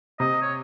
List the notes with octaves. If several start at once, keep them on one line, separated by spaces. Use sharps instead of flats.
C3 D#5
C#5